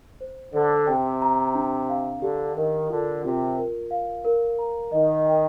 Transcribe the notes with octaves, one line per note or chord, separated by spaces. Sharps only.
C5
D3 C5
C3 G5
A#5
D4
F5
D3 G4
D#3 A#4
D3 F4
C3 F4
A#4
F5
A#4
A#5
D#3 D#5
G5